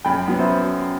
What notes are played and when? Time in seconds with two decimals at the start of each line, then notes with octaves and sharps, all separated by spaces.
0.05 F#2 G5 B5
0.28 F#3 B3
0.39 C5 E5